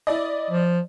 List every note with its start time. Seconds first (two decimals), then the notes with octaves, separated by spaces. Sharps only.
0.07 E4 D5 D#5
0.50 F3